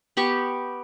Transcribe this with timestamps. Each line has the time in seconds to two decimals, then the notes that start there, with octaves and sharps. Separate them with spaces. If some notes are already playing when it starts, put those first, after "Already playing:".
0.17 B3 G4 C#6